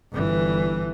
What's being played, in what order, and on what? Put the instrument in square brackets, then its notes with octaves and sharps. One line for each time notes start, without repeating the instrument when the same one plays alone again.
[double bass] G1 E3